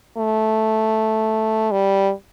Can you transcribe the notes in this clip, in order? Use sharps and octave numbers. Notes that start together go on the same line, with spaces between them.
A3
G3